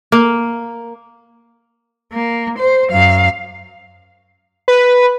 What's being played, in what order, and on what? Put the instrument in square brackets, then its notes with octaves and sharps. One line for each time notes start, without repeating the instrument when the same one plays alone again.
[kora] A#3
[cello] A#3
C5
F#2 F5
[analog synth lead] B4